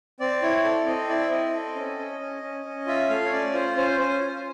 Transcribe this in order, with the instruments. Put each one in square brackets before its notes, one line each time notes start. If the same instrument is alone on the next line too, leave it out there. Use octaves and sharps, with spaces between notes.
[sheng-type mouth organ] C4 D5
E4 C#5
A4 D5
C4 D#5
E4 D5
E5
C4 D#5
A4
C#4
C#4
C#4
C#4
C#4
F4 E5
A3 F5
C#5
C#4 D5
F4 C5
C#4 C5
C#4 C5
F4